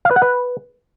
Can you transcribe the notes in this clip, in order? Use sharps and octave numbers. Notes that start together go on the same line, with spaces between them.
F5
B4
F#5
B4